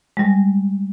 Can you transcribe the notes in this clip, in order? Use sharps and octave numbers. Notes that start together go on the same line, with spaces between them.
G3 G#3